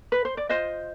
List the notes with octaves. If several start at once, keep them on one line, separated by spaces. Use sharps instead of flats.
B4
C5
D5
F4 C5 D#5